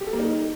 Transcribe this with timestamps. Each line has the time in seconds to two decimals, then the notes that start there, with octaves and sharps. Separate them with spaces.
0.01 G4
0.07 A4
0.13 A#3
0.19 D#4